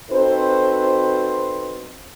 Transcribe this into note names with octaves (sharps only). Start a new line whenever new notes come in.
C4 D#4 F#4 A4 B4 C5